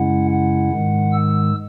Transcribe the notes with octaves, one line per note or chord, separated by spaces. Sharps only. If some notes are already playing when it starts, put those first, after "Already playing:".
Already playing: F#2 C#3 G#3 C#4 E4 F#5
F#5
G#2 D#3 G#3
E6